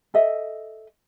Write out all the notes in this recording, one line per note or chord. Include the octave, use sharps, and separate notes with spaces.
A4 D#5 E5